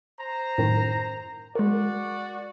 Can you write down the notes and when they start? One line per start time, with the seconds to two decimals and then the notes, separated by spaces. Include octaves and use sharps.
0.20 C5 A#5
0.58 F#2 A2 D#3
1.55 G#3 F#4 A#4 D5